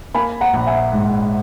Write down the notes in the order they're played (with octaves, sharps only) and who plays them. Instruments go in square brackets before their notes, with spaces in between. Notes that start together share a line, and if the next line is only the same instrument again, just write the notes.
[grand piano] A#3 G#5 B5
F#5 A#5
A#1
E5 G#5
G#2